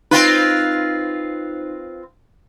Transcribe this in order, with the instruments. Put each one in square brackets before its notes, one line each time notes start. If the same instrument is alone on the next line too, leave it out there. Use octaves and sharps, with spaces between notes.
[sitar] C4 F4 B4 [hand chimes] D#4